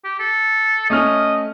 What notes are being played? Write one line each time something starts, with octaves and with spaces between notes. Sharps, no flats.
G4
A4
A3 C#4 D#5 F6